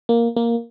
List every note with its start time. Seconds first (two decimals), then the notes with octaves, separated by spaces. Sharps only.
0.09 A#3
0.36 A#3